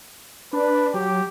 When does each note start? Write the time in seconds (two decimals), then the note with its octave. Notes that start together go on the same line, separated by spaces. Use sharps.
0.53 D4 B4
0.94 F#3 G4